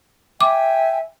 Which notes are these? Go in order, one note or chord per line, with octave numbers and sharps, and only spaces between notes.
E5 G5 G#5 D6